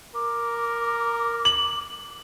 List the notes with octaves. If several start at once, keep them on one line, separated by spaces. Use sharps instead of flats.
A#4 D6
F#7